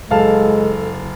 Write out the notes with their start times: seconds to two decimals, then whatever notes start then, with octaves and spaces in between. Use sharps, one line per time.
0.11 F#1 G#3 A4 F5 A5